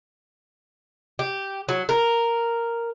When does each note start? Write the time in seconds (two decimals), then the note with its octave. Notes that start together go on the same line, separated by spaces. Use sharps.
1.19 G4
1.69 F#3
1.89 A#4